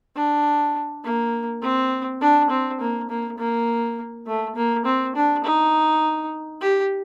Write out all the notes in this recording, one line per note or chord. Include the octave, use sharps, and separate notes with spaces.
D4
A#3
C4
D4
C4
A#3
A#3
A#3
A3
A#3
C4
D4
D#4
G4